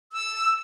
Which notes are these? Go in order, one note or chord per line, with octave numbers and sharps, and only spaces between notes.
E6